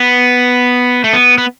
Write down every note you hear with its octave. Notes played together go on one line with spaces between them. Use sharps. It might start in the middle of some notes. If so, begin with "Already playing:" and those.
Already playing: B3
A3
B3
B3